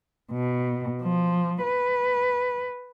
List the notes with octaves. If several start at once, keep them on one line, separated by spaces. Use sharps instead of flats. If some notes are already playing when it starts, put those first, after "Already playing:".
B2
F3
B4